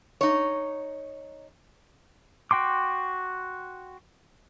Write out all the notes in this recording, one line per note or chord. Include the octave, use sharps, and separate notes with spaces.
D#4 C#5
F#4 G5 C6 D6